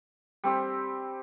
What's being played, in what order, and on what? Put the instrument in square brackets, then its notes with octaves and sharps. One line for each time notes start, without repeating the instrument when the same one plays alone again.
[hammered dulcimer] G3 C4 G4